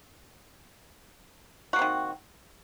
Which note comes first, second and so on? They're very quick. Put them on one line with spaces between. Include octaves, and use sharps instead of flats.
F#4 A#3 C4 D#3